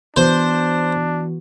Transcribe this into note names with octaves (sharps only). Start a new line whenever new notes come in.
E3 B3 D4 F#4 C5